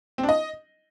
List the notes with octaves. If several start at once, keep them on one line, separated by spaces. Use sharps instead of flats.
C4
D4
D#5